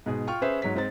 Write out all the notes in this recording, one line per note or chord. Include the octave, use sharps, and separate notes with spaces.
G#2 B2 G#4
F4 G5 C#6 F6
C#4 G#4 B4 C5 E5
G#2 F#3 C#5 B6
G#2 C4 D#4 A6